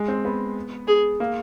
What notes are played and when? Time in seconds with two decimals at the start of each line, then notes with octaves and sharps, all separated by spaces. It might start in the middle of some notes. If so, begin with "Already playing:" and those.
Already playing: G#3
0.08 C4
0.25 B3
0.88 G#4
1.20 A#3